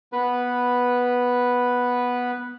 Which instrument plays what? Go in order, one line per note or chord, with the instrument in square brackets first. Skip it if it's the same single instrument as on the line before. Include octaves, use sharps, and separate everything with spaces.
[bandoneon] B3 B4